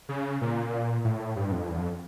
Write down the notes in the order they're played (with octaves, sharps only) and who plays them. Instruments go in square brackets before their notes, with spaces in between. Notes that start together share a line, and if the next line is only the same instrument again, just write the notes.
[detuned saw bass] C#3
A#2
A2
G2
F2
E2
F2